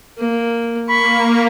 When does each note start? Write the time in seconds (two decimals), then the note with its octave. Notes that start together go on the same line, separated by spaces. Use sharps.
0.18 A#3
0.89 A#3 B5 C#6